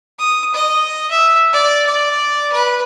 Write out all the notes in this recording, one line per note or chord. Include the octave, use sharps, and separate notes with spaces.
D#6
D#5
E5
D5
D5
B4